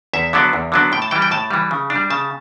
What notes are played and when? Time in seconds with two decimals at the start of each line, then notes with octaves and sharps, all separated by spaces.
0.13 E2 E5
0.33 D3 F#3 B3 D4
0.53 E2
0.72 D3 F#3 B3 D4
0.92 A2 G5
1.02 A5
1.11 E3 G3 G5
1.22 G5
1.31 A2 A5
1.51 E3 G3
1.71 C#3
1.90 D4
1.95 G3
2.10 C#3 A5